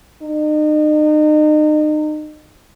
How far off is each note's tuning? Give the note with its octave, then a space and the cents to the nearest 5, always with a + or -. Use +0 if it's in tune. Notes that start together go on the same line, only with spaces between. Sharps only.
D#4 -35